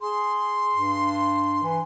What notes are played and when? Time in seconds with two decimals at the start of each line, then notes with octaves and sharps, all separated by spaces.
0.01 G#4 C6
0.73 G2
1.63 E3